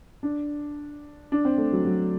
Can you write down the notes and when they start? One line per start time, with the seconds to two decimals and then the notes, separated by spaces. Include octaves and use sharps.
0.23 D4
1.32 D4
1.45 C4
1.58 A3
1.72 F#3
1.85 F#3